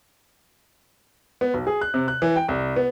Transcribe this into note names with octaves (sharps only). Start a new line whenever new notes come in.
B3
B1
G#4
F#6
C3
F#6
E3
G5
C2
B3